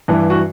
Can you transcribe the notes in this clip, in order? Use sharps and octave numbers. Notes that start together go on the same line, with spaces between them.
G2 E3
F#4